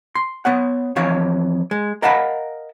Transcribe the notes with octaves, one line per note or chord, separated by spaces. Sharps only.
C6
B3 C#5 F#5
F2 E3 C#5 F5
G#3
A#4 D#5 F5 F#5 A5 B5